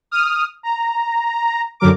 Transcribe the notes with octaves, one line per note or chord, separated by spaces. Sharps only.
D#6 F6
A#5
F#2 D3 F#3 A#4 D6